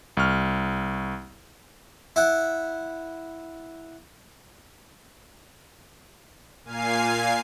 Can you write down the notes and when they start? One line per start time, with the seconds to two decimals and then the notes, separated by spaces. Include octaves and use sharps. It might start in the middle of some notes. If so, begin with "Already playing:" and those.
0.17 C2 C#6 F6
2.16 E4 F#5
6.65 A#2 F5 G#5 C7